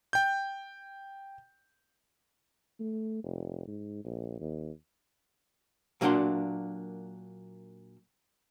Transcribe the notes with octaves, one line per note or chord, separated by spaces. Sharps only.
G5 G6
A3
F1
G#2
A#1
D#2
A#2 F#3 A#3 D4 F#5 C6